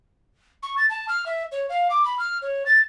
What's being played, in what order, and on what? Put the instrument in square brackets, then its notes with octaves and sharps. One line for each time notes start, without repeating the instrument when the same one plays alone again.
[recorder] C#6
A6
A5
F6
E5
C#5
F5
D6
B5
F6
C#5
A6